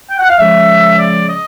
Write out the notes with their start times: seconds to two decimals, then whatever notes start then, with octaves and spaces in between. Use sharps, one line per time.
0.09 G5
0.19 F#5
0.28 F5
0.38 C#3 F3 G#3 E5
0.98 D5
1.27 D#5